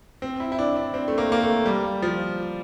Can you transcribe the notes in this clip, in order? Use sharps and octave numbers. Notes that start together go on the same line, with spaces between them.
C4
E4
E4
D4
D4
C4
A3
A#3
A#3
A3
G3
F3